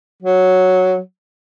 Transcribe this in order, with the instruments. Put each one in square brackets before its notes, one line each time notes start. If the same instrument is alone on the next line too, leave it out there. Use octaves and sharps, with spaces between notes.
[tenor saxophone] F#3